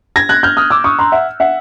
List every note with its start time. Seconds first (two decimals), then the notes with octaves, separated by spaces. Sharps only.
0.16 G#6 A#6
0.29 F#6 G#6
0.43 F6 G6
0.57 D#6 F6
0.70 D6 E6
0.84 C#6 D#6
0.99 A#5 C6
1.12 E5 F#5
1.40 E5 F#5